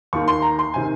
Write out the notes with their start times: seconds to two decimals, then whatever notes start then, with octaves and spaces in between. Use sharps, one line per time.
0.13 D#2 D#3 C#6
0.28 C6
0.42 A#5
0.59 C6
0.74 C3 D#3 G#5